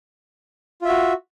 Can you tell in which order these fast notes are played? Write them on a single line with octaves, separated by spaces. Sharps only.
F4 E5 F#4